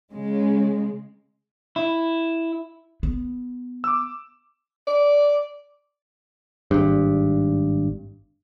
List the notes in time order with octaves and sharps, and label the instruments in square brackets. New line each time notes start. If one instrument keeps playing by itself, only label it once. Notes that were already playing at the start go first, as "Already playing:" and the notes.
[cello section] C#3 G#3
[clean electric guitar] E4
[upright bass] B3
[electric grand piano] D6 E6
[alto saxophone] D5
[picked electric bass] G#1 G2